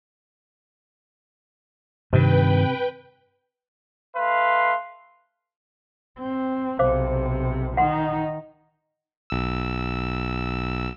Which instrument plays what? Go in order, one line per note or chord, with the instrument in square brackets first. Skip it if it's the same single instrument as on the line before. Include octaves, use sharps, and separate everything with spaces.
[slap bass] G2 D#3 [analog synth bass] C3 [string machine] B4 G5
[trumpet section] A3 B4 F5 C6
[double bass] C4
[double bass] B1 C3 [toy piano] C5 F5 D6
[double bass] D#3 D#4 [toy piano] F#5 C6
[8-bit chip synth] B1 E6